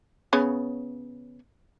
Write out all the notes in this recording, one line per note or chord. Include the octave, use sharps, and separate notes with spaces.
C#3 B3 C#5